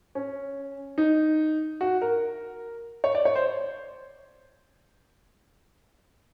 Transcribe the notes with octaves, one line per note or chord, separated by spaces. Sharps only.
C#4
D#4
F#4
A#4
C#5
D5
C#5
C5